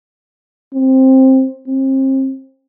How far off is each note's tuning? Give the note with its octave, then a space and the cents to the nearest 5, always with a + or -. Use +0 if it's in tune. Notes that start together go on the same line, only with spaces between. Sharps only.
C4 +10
C4 +35